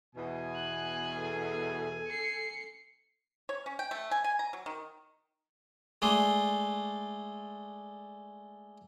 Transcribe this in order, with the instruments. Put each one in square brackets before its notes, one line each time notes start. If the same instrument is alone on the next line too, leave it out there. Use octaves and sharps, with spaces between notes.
[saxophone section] E2 B2 [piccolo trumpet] G#5
[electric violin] F#6
[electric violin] G#4 [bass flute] A4
[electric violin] C7 C#7
[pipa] C#5
C#4
G5
A3
G#5
G#5
A#5
F#3
D#3
[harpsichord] G#3 A3 D4 C6